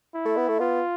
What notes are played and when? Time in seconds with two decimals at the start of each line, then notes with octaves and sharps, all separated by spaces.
0.14 E4
0.25 A3
0.37 B3
0.48 A3
0.60 B3 F4